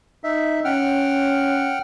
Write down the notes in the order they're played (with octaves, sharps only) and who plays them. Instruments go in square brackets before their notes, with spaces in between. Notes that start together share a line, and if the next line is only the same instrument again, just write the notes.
[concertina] D#4 E5
[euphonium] C#4 [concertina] F#5 G5 F6